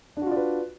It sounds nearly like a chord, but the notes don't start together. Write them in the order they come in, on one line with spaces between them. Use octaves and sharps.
D4 F#4 F4 D5 B4